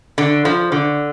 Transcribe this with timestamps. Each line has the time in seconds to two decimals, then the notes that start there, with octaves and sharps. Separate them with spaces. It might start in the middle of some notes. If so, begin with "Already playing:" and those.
0.18 D3
0.45 F3
0.72 D3